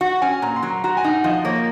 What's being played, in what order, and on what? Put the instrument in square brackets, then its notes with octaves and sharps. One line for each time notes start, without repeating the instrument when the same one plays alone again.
[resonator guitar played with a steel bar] F#4 [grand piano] F#5
[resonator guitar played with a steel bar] C#4 [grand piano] G#5
[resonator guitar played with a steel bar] A#2 [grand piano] A#5
[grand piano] C6
[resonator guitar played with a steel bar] F#3
[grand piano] A#5
[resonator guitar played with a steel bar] F#4 [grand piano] A#5
[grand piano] G#5
[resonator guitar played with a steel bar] D#4
[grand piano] F#5
[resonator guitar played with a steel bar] F3 [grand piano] D#5
[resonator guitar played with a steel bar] A#3 [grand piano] C#5